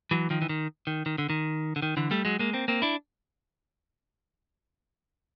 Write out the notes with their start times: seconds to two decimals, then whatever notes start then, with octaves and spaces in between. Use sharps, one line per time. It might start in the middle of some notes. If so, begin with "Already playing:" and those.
0.11 E3 F#3
0.30 D#3 F3
0.42 E3
0.49 D#3
0.87 D#3
1.06 D#3
1.18 D3
1.30 D#3
1.76 D3
1.82 D#3
1.97 D3 E3
2.11 G3 A3
2.25 F#3 G#3
2.39 G#3 A#3
2.53 A#3 C4
2.68 A#3 C4
2.82 D4 E4